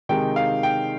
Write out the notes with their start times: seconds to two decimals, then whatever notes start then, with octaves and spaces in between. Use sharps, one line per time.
0.09 C3 D#3 G#3 D#4 G5
0.36 F5
0.63 G5